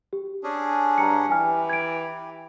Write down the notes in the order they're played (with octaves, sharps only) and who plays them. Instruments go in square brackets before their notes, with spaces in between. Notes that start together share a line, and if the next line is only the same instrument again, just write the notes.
[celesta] G4
[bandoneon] C#4 D4 G#4
[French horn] G2 [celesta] G#5 A#5 C#7
[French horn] E3 [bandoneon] G4 [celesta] G#5 F6
[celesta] G#6 D7